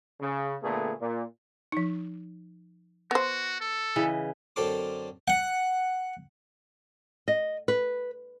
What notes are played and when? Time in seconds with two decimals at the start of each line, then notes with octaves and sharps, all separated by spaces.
0.20 C#3
0.62 A#2 D3 A3 B3 G#4
1.00 A#2
1.72 F3 D#4
3.11 B3 F#4 C5
3.60 A4
3.96 C#3 E3 D#5
4.56 F#2 D3 C4 A4 C6 D6
5.28 F#5
7.28 D#5
7.68 B4